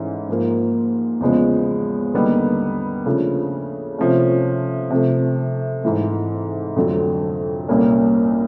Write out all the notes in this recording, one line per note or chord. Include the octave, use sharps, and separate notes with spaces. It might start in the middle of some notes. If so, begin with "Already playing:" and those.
Already playing: G#2 E3 A3 C#4
G#2 F3 A#3
E2 C#3 F3 G#3 B3
D#2 D3 G3 B3 D#4
C#3 F3 A3 D4 F4
C3 F3 A3 C#4
C3 F3 A3
G#2 E3 A3
F2 D3 F#3 A3
C2 A#2 G3 A#3 C#4